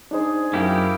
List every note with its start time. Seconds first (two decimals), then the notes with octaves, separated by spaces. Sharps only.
0.11 D4 D#4 G#4 C5
0.53 F#2 A#3 E4 G4